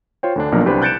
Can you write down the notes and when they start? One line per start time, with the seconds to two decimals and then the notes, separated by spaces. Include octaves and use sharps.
0.23 F4 C5 C#5 G5
0.36 D2 D3 D4
0.52 B1 F3 A#3 D4 A#4
0.66 C2 D4 G4 B4 C5 B5
0.82 F#6 G6 A6 C#7 D7 E7